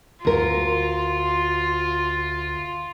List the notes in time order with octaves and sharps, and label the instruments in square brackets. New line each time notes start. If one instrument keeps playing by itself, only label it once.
[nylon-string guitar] D2 A#4 [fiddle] F4